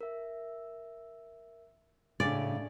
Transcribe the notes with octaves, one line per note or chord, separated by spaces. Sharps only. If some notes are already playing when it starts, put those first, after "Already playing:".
A#4 E5
A2 C#3 D4 A4 D5